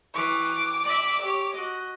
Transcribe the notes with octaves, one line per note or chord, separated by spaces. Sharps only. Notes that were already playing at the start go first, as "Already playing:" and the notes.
E3 C#6 D6
D5 E5
G4 C#5
F#4 D#5